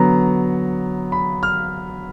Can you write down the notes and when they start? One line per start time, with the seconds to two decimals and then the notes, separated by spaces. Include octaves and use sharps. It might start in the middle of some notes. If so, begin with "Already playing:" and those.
Already playing: D3 F#3 B3 A#5
1.12 B5
1.43 F6